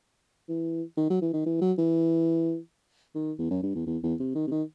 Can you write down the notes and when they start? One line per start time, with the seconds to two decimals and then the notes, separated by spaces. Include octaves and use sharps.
0.49 E3
0.97 D#3
1.10 F#3
1.22 E3
1.33 D#3
1.46 E3
1.61 F#3
1.78 E3
3.15 D#3
3.39 E2
3.51 F#2
3.63 G2
3.75 E2
3.87 E2
4.03 E2
4.20 C3
4.35 D#3
4.47 C3
4.51 D#3